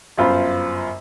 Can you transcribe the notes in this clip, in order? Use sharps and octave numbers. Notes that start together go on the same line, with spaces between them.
G1 F#2 F4 C5 B5